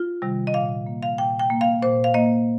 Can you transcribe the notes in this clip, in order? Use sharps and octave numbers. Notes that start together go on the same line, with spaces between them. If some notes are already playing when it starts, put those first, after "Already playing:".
Already playing: F4
C3 D#3 G3
D#5
A#2 F5
A#3
F5
A#2 G5
G5
A#3
F5
A#2 C5
F5
A#3 D#5